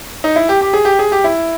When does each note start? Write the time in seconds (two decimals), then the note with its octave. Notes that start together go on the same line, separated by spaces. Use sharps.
0.24 D#4
0.36 E4
0.49 G4
0.61 G4
0.74 G#4
0.85 G4
0.99 G#4
1.12 G4
1.24 E4